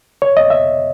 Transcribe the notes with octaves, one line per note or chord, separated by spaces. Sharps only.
C#5
D#5
E5